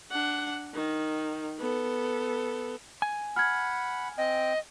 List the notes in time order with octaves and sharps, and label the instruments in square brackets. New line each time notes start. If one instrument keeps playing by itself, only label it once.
[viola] D4 F#5
D#3
B3 A4
[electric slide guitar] G#5
[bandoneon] F#5 B5 [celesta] F6 G#6
[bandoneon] C4 G5 [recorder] D#5